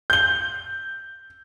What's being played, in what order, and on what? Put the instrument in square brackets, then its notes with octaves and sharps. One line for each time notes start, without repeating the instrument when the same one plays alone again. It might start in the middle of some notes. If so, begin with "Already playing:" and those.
[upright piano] G6 G7